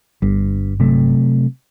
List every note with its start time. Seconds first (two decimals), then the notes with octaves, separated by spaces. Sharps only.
0.22 G1 G2
0.80 C3 F#3 A3